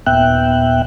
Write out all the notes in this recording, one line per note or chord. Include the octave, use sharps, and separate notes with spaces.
D#2 A#2 B3 E5 G5 F#6